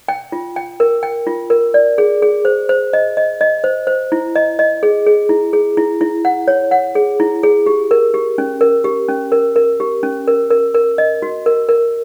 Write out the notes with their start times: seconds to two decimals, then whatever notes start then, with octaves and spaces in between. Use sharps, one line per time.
0.08 G5
0.32 F4
0.56 G5
0.80 A#4
1.03 G5
1.27 F4
1.50 A#4
1.74 D5
1.98 G#4
2.22 G#4
2.45 C5
2.69 C5
2.93 D#5
3.17 D#5
3.41 D#5
3.64 C5
3.87 C5
4.12 E4
4.36 D#5
4.59 D#5
4.83 G#4
5.06 G#4
5.29 E4
5.53 G#4
5.77 E4
6.01 E4
6.25 F#5
6.48 C#5
6.71 F#5
6.95 G#4
7.20 E4
7.43 G#4
7.66 G4
7.91 A#4
8.14 G4
8.38 C#4
8.61 A#4
8.84 G4
9.09 C#4
9.32 A#4
9.56 A#4
9.80 G4
10.03 C#4
10.27 A#4
10.50 A#4
10.74 A#4
10.98 D#5
11.22 F#4
11.46 A#4
11.69 A#4